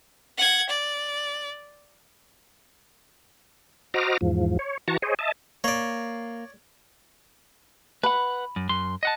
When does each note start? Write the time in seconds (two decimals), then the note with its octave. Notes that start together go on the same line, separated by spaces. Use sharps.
0.38 F#5 G#6
0.69 D5
3.94 F#4 C5 D#5 A#5 D6 F6
4.21 E2 G#2 F3
4.59 C#5
4.88 E3 F#4 A5 A#5 C#6
5.02 G#4 C5 C#5 D#5
5.19 D#5 E5 A5
5.64 A#3 C#5 D5
8.03 B4 F#5 B5
8.56 F#2
8.69 F#2 C6
9.03 D#5 F#5 A5